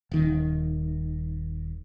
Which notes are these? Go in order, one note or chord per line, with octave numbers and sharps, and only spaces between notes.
D#1 D#3